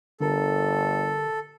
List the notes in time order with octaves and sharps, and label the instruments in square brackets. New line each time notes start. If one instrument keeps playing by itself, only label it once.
[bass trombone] G1 [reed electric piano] D3 A#4 [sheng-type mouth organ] A4